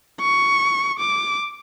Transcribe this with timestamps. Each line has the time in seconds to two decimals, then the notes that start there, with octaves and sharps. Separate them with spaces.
0.21 C#6
0.99 D6